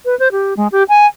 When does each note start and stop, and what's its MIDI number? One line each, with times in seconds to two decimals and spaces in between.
0.05 0.17 71
0.19 0.28 72
0.32 0.54 67
0.57 0.68 56
0.72 0.83 67
0.89 1.06 80